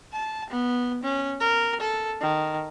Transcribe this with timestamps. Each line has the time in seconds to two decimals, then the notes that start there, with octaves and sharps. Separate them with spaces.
0.13 A5
0.50 B3
1.03 C#4
1.40 A#4
1.80 A4
2.21 D#3